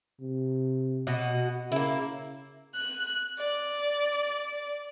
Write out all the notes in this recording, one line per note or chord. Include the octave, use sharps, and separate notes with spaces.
C3
B2 F#4 D#5
C#3 A#3 E4
F#6
D5